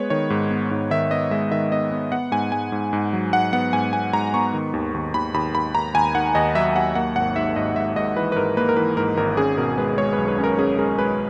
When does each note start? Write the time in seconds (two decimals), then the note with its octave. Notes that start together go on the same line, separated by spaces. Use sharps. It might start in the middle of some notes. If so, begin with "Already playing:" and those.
Already playing: G#3 B3 B4 C#5
0.10 D#3 C#5
0.30 G#2
0.51 B3
0.71 G#2
0.91 D#3 E5
1.11 B3 D#5
1.31 G#3 E5
1.51 D#3 E5
1.71 B3 D#5
1.91 B3
2.12 B3 F#5
2.32 G#2 G#5
2.52 G#2 G#5
2.72 G#2
2.93 G#2
3.13 F#3
3.33 G#2 F#5
3.53 B3 F#5
3.73 G#2 G#5
3.93 B3 G#5
4.13 G#2 A#5
4.34 B3 C#6
4.54 D#3
4.74 D#2
4.94 D#2
5.14 D#2 B5
5.34 D#2 B5
5.55 D#2 B5
5.74 D#2 A#5
5.95 D#2 G#5
6.15 D#3 F#5
6.35 D#2 D#5
6.55 F#3 E5
6.75 D#2 F#5
6.95 A#3 F#5
7.16 G#1 F#5
7.36 G#2 E5
7.56 G#2 D#5
7.76 G#2 E5
7.96 G#2 D#5
8.16 E3 B4
8.32 B4
8.36 G#2 A#4
8.57 A#3 B4
8.69 A#4
8.77 E3 B4
8.97 G#2 A#4
9.17 G#1 A#4
9.37 C#4 G#4
9.57 B2 A#4
9.78 G#3 B4
9.98 G#3 C#5
10.13 B4
10.18 B1
10.28 B4
10.38 C#4
10.44 A#4
10.59 C#4 G#4
10.79 G#3 A#4
10.98 G#3 B4